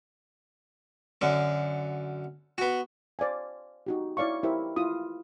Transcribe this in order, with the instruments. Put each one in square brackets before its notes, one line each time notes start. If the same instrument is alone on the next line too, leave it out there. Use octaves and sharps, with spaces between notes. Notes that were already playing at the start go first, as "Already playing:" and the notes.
[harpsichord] F#2 D3
B3 F#4
[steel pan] C5 D5 F5 G#5
D#4 F#4 G4
E4 C#5 D5 F5 C#6
E4 G4 A#4 C5 E5
E4 F4 D#6